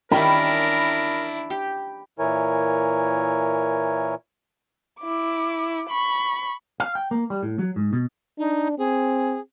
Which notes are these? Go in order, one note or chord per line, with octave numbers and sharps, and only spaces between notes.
D#3 G3 C#4 D4 E4 A#4 B5
G4
A#2 E3 E4 A#4 C#5 G#5
E4 D6
B5 C#6
F5
G5
A#3
G3
A2
F#3
G#2
B2
D4 D#4
C4 G#4